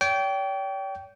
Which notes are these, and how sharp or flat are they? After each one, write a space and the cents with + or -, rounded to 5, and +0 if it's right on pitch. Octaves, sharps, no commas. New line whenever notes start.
C#5 +45 G5 -15